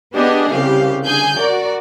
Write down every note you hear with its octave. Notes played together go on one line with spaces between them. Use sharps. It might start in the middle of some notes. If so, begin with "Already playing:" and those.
B3 D4 G4 G#4 D#5
C2 C#3 G4 F5
D3 G#4 G#5 G6
F#4 A#4 D5